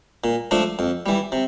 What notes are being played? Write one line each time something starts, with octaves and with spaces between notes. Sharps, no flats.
A#2
F3 A3 D4
F2
E3 G3
C3